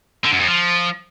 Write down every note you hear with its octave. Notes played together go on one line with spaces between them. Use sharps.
D3
F#2
F2
F3